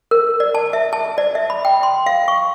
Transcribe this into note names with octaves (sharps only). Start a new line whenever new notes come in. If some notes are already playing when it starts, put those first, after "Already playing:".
A#4
D5
A5
E5
A5
D5
E5
B5
G5
C6
F5
C#6